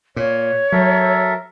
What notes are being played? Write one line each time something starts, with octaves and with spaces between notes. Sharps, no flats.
A#2 C#5
F#3 A4 A#4 E5